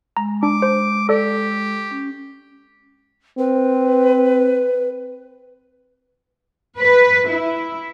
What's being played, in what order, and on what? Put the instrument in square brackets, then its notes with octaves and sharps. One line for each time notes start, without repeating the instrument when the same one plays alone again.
[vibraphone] G#3 [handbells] A#5
[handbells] D4 [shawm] D6
[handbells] C5
[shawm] G4 [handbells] A4 D5
[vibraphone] C#4
[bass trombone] C4 [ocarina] B4
[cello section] B4
E4